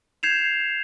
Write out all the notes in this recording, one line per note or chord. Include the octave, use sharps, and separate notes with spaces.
G6 G#6 C7 E7 F7